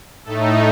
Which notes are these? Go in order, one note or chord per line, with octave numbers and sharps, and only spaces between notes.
A2 A3 D#4 A4